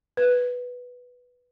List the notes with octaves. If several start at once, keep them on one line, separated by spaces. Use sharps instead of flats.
B4